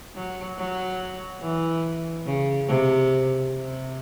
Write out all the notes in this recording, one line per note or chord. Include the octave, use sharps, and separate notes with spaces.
F#3
F#3
E3
C#3
C3
C3